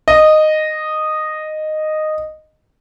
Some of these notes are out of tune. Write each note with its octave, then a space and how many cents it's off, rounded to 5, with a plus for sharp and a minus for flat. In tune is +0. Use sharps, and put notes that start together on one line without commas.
D#5 -10